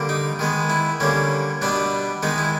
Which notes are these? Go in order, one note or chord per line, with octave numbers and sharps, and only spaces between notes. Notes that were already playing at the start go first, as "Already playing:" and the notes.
Already playing: D3 G3 A#3
D#4
D#3 G#3 B3
E4
D3 G3 A#3 C#4
B2 G3 B3 D4
D#3 G#3 B3 D#4
E4